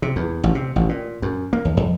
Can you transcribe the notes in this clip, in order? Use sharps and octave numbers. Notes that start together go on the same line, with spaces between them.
C3
E2
A1
C3
A1
A#2
F#2
A#3
D#2
F2